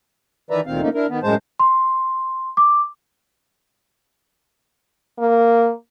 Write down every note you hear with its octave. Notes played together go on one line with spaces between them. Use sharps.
D#3 E3 B4 D5 E5 A#5
D2 A#2 D#3 C4 F5
C#3 F3 A3 A#3 C#4 D#4
D4 E4 A#4
D#3 B3
F#2 A2 G#3 C5 A5
C6
D6
A#3